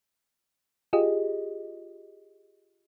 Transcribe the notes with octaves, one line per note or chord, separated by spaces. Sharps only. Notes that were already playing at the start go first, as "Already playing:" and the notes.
F4 G4 G#4 D#5